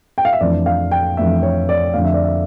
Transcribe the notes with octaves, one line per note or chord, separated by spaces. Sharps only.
G5
F5
E5
F2 E3 A3 D4 D5
F5
G5
F2 E3 A3 D4 E5
C#5
D5
F2 D3 A3 F5
E5
D5
E5